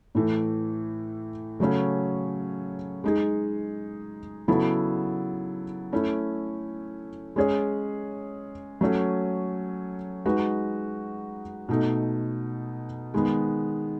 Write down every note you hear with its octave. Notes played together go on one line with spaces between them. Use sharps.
A2 E3 A3
C#3 F#3 A3 C#4
G#3 D#4 G#4
C#3 F#3 B3 E4 A4
A3 C#4 E4
G#3 C#4 G#4 C#5
F#3 A3 C#4
G#3 D#4 F#4 B4
B2 A3 D#4
D#3 G#3 B3